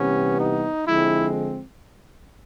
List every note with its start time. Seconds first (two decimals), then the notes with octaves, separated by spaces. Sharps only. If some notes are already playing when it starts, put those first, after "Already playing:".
Already playing: C3 E3 G3 B3 C#4
0.39 D#4
0.86 D3 F3 G#3 C4 E4